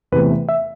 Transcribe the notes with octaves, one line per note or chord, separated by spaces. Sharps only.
E2 C3 E3 A3 B4
E5